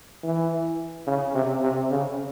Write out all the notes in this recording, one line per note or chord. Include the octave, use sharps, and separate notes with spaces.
E3
C#3
C3
C3
C#3